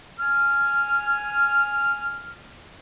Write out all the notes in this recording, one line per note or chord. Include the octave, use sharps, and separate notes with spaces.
G#5 F6